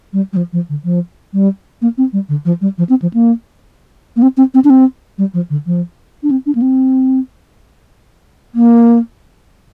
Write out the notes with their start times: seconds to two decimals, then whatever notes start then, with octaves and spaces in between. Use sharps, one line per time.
0.13 G3
0.33 G3
0.37 F3
0.53 F3
0.69 D3
0.84 F3
1.34 G3
1.82 A#3
1.98 C4
2.13 G3
2.29 D3
2.45 F3
2.61 G3
2.78 F3
2.89 C4
3.02 F3
3.14 A#3
4.16 A#3
4.22 C4
4.37 C4
4.54 C4
4.64 D4
4.70 C4
5.18 G3
5.34 F3
5.50 D3
5.66 F3
6.23 D4
6.31 C4
6.46 D4
6.55 A#3
6.62 C4
8.55 A#3